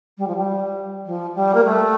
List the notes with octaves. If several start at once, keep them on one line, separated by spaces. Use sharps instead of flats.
G3
F3
G3
F3
G3
A#3
A3